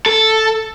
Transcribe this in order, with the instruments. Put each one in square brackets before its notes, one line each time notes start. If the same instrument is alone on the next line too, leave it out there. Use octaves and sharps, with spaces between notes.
[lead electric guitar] A4